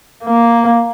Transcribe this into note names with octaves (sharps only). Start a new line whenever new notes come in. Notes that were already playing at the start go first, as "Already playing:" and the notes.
A#3